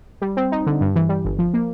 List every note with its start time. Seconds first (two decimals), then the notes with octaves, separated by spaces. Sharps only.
0.22 G3
0.37 C4
0.52 D#4
0.66 D3
0.81 G2
0.96 E3
1.09 G3
1.25 G1
1.39 F3
1.54 A#3